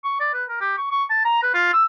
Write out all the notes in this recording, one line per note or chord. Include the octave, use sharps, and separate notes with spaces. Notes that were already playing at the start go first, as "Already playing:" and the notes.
C#6
D5
B4
A#4
G4
C#6
C#6
A5
A#5
B4
F4
E6